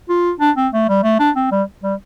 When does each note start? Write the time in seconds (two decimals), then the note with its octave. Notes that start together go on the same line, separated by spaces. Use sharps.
0.09 F4
0.40 D4
0.57 C4
0.73 A3
0.89 G3
1.03 A3
1.20 D4
1.36 C4
1.52 G3
1.83 G3